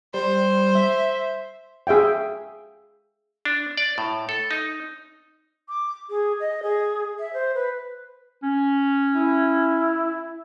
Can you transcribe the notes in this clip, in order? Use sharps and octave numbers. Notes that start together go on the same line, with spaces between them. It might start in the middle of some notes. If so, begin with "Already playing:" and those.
G3 C5
E5
G#4 E5 F5 G5
D4
D5
A2
A4
D#4
D6
G#4
D#5
G#4
E5
C5
B4
C#4
E4